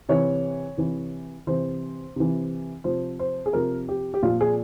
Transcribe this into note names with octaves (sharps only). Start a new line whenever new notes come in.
C3 E3 C#5
C3 E3
C3 E3 C5
C3 E3
C3 F3 C5
C5
G#4
C3 F3 A#4
G4
G4
A#2 F3 F4
G#4